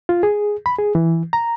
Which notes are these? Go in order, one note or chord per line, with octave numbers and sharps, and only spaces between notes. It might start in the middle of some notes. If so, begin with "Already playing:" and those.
F4
G#4
B5
G#4
E3
A#5